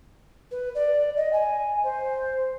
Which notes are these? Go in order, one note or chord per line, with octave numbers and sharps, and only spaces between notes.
B4
D5
D#5
G#5
C5